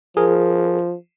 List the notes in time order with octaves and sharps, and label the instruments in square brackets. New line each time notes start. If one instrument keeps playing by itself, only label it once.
[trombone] F3 [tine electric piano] G#4 A#4